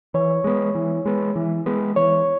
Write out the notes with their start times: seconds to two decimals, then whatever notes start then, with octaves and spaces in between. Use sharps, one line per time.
0.14 E3 C#5
0.44 G#3 B3
0.75 E3
1.06 G#3 B3
1.36 E3
1.66 G#3 B3
1.96 E3 C#5